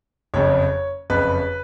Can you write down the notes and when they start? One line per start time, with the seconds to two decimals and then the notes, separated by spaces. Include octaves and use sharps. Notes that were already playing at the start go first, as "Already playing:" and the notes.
0.34 F#1 F2 C#3 C#5
1.10 F#1 F2 C#3 B4